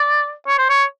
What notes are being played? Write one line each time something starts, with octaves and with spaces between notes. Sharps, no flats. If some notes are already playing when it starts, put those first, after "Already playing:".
Already playing: D5
C#5
C5
C#5